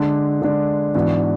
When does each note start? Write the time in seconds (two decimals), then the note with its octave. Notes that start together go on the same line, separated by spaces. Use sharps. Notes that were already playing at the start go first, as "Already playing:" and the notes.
Already playing: D3 G#3 D4
0.42 D3 G#3 D4
0.94 G#2 E3 B3 D4 F#4